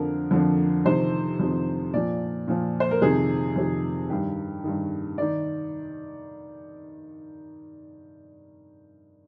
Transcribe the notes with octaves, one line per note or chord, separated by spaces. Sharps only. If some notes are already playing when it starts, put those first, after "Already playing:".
Already playing: F2 D3 F3 A#4
F2 D3 F3
F2 C3 D#3 C5
F2 C3 D#3
A#2 F3 D5
A#2 F3
C5
A#4
F2 C3 D#3 G#4
F2 C3 D#3
G2 D#3 G4
G2 D#3
D#3 D5